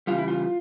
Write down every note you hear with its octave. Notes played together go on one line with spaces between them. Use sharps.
C#3 E3 G3 F4
E4
F4